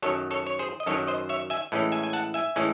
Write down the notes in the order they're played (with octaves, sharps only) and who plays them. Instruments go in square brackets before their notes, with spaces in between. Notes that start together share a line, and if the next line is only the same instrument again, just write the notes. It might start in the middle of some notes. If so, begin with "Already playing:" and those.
[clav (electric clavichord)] F#2 D#3 F#3 A4 C#5
A4 C#5
C#5
G#4 C5
D#5
F#2 D#3 F#3 A4 C#5
C5 D#5
C#5 E5
E5 G#5
A2 E3 G#3 C#4
E5 G#5
G#5
F#5 A5
E5 G#5
A2 E3 G#3 C#4